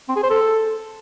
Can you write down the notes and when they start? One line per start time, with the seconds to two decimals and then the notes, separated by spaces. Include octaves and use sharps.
0.09 C4
0.16 G#4
0.23 C5
0.30 A4